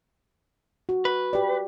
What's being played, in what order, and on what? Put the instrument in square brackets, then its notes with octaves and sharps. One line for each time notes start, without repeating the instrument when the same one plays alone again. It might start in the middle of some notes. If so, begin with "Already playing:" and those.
[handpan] F#4
[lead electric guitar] B4
[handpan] G4 D5